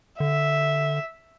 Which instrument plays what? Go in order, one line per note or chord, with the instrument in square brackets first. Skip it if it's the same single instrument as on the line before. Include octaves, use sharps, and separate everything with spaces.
[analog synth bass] D3 [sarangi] E5